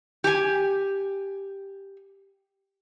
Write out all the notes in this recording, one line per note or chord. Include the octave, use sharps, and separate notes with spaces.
G4 G#5